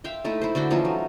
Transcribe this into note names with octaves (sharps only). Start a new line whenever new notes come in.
E5 F5 G5 C6
A3 D#4 E4
E4 C5
D3 F#4 C5 G5
E3 F3 C#4 D#4
F#3